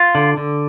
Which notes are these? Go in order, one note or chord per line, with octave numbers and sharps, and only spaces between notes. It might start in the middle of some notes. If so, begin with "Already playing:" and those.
Already playing: F4
D3
D3